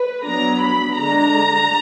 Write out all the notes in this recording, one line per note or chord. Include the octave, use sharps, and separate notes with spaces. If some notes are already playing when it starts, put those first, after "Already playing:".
Already playing: B4
F#3 B3 D4 A#5
B5
D3 G#3 D4 A#5